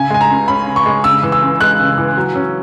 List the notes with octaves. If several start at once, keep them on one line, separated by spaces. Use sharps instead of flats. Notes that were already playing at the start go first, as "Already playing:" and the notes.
Already playing: C#3 G#5
G#3 G#5
A#5
C#2
C#4 B5
C#3
C#6
G#3
C#3 E6
E3
E6
C#2
G#3 F#6
C#3
E3
F#3
C#4